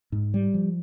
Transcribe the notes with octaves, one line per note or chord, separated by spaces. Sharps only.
G#2
G3
F3